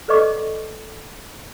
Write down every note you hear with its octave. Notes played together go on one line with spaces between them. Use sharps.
A4 B4 D5 D#5 C#6 D6